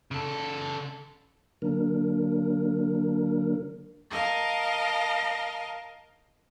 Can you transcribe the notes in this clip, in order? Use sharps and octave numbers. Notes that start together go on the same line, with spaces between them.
C#3 A4
D3 F#3 A#3 D4 A#4
A#4 D#5 F5 A5